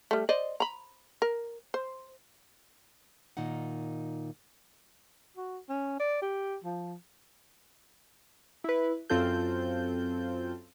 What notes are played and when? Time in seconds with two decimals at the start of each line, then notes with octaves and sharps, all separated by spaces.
0.11 G3 A3
0.29 C5 D5 D#5
0.60 A#5 B5
1.22 A#4
1.74 C5
3.37 A#2 D#3 D#4 F#5
5.37 F#4
5.69 C#4
6.00 D5
6.22 G4
6.64 F3
8.64 E4 B4
9.10 F#2 C4 F4 A4 G6